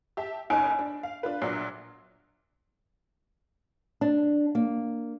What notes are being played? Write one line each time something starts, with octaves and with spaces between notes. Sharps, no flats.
G4 E5 A5
F#1 C#4 D#4 G#5 D7
D4
F5
D4 F4 B4
A#1 A#2 F#3 D4 F#6 C7
D4
A#3